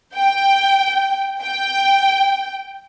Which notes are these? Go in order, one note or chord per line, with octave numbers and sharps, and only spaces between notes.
G5
G5